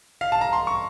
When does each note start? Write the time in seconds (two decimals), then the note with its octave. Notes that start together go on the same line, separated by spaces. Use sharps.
0.21 F5
0.32 A5
0.41 A#5
0.53 C6
0.67 C#6